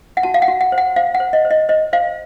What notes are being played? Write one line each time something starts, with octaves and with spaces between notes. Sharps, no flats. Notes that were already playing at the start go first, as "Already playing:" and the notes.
F#5
F#4 A5
F5
F#5
F#4
F#5
C5
F#5
C5 F5
F#5
C5
D#5
C5
D#5
C5 D#5
C5 F5